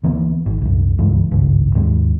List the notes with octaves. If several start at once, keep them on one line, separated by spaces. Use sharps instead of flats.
D2 E3 A#3 B3
G#1
C2 F#2
C#2 G2 E3 G#3
G#1 C#2 G2
D#2 G#2 G#3